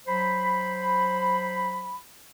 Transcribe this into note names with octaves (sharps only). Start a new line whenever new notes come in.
F#3 C5 B5